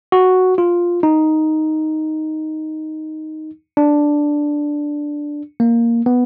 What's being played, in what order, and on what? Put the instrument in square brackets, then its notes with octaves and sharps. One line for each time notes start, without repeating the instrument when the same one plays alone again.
[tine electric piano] F#4
F4
D#4
D4
A#3
B3